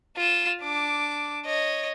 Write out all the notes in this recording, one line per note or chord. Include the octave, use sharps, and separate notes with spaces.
F4 E7
D4 D6
C#5 D#5